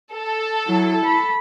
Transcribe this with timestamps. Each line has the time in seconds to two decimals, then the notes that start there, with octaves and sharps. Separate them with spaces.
0.13 A4
0.67 F#3 E4
1.05 B5